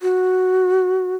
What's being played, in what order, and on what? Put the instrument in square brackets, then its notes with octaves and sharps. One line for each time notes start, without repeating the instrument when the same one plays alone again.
[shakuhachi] F#4